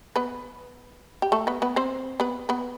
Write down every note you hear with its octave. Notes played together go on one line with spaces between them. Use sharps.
B3 B4
G4
A3 A4
B3 B4
B3 B4
C4 C5
B3 B4
B3 B4